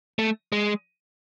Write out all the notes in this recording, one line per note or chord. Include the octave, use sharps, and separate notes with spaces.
A3
G#3